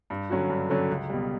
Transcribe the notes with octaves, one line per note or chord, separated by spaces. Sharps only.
G2
D3 F#3 C#4 F#4
G2
D3 F#3 C#4 F#4
C#2
B2 G3